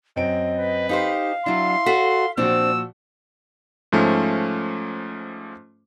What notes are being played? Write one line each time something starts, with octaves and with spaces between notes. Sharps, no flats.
F#2 C4 D#5 D7
B4
D#4 G4 C5 F5
F#3 D4 E4 C6
F#4 A4 C#5 B6
A#2 F3 C4 D4 F#4 C5 E6
G#2 F3 A3 C#4